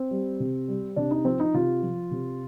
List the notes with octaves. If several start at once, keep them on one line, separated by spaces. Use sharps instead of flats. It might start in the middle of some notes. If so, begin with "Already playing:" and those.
Already playing: C4
G3
C3
G3
C3 D4
D#4
F3 C4
D#4
C3 F4
F3
C3